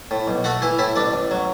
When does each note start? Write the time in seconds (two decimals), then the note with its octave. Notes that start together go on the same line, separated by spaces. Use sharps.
0.11 A2
0.28 B1
0.44 A3 F#4 F#5
0.62 E3 E4 E5
0.79 A2 E4 E5
0.96 A1 D4 D5
1.13 A1
1.31 F#3